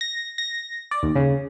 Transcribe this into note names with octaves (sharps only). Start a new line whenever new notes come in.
A#6
A#6
D5
D#2
C#3